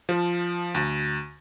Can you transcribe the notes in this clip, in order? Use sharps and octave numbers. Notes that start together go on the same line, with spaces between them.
F3
D2